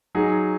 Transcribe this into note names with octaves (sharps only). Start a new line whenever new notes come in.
F#3 D#4 G#4